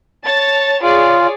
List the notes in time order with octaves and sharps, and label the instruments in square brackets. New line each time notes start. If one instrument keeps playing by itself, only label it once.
[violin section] C#5 A5 A6
[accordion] F4 [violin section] G#4 C#5 D5